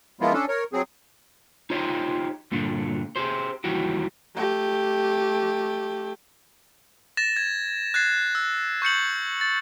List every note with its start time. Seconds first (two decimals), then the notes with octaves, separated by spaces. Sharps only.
0.21 F3 G#3 A#3 B3 E4 F4
0.33 C#4 D4 A4
0.48 A#4 C#5
0.73 F#3 C4 G#4
1.70 D#4 F4 G4 C5 C#5 D#5
2.52 G2 A#2 D3
3.16 G4 G#4 C5
3.64 D#2 D#3 E3 G3 F#4 G4
4.36 A3 G4
7.17 A6 A#6 E7
7.36 G#6
7.94 F#6 G#6 A6 C7
8.35 E6
8.82 C#6 G6 C#7 F#7
9.41 A6